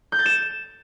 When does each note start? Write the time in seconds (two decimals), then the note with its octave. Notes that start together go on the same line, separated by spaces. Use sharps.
0.12 G6
0.19 A6
0.26 E7